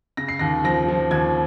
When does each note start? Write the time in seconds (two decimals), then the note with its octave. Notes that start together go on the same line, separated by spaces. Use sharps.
0.17 C#3 A#6
0.28 C7
0.39 D#2 A#6
0.64 F3 A#6
0.88 F3
1.11 D#2 G#6